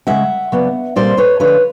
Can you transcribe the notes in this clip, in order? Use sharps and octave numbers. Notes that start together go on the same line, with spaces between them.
C#3 E3 G#3 C#4 E5 F#5
C#3 F#3 B3 D4
A#2 G3 C4 C5 D5
B4 C#5
D3 F3 A3 D4 B4 C#5